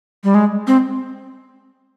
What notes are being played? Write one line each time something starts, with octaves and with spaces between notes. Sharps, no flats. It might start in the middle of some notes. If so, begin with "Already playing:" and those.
G3
G#3
C4